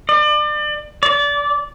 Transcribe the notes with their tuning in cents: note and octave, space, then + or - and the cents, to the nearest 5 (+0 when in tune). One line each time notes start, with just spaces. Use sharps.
D5 +35
D5 -25